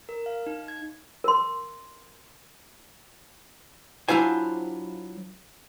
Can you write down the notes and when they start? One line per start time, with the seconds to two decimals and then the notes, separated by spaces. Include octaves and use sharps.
0.09 A#4
0.26 F5
0.46 D#4
0.68 G#6
1.24 A#4 C6
4.09 F#3 D4 E4 F4 C5 G#5